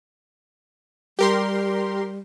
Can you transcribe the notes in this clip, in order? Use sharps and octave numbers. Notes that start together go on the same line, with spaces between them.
G3 G4 A#4 C6